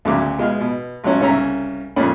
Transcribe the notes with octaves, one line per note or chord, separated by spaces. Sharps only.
D2 C#3 F#3 D6
B2 G#3 F5 F6
B2
A1 F#3 C#4
C2 C#3 C#4 E5 A#5
F2 A#2 C#4 B5